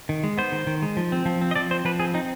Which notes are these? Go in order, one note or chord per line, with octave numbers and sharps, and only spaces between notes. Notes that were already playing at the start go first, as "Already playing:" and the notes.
D#3
G#3
B3 C5
D#3
D#3
G#3
F3
C4
F3
C4
D#5
F3 D5
C4 C5
F3 B4
C4 G#4
C4 D#4